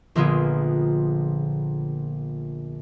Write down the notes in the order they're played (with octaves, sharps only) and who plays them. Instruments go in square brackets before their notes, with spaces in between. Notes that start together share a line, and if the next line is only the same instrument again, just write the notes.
[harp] A#1 D3 A#3 B3 F4 G#4